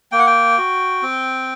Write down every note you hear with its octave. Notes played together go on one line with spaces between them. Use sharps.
A#3 G5
F#5
G5
F#4
C4